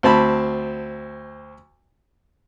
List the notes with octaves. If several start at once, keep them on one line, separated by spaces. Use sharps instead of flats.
D2 C4 A5 B5